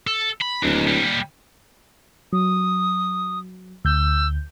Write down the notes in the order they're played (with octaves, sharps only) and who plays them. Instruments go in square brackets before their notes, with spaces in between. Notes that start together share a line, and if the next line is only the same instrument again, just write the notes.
[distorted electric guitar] A4
B5
[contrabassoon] D1 [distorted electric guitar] D#2
[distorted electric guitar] A#2 G3
[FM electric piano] F#3 [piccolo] D#6
[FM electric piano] D2 G6 [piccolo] E6